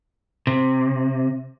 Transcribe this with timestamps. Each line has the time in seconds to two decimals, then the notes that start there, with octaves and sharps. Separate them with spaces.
0.47 C3